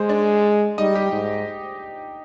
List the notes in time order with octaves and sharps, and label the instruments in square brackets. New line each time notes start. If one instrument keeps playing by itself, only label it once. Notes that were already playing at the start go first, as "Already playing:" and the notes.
Already playing: [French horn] G#3 [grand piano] C5
[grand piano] D4 D5
[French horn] G3 [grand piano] D#4 D#5
[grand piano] G4 G5
[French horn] G#2